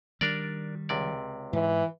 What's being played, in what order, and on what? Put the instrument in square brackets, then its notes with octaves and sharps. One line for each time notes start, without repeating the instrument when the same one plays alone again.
[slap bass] D#3 G3 [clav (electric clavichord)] D4 A#4 D5
[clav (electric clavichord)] C#2 C3 D5
[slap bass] G#2 [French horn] E3